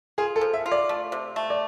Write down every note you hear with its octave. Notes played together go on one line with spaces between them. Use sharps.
F4 G#4
A4
F3
E5
F4
D5
A3
C3
A3
D5